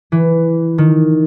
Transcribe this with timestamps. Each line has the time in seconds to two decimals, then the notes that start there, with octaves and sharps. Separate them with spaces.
0.12 E3
0.78 D#3